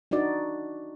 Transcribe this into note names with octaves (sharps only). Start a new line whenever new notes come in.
D4 D#4 F#4 D5